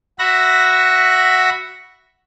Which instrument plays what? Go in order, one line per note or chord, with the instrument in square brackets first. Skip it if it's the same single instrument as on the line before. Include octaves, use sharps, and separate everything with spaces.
[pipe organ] F#4 E5 F#5 B5 A#6